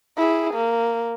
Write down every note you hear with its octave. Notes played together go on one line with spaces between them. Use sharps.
E4 G#4
A#3